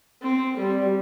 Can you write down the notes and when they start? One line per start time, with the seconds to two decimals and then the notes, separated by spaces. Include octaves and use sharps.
0.22 C4
0.59 G3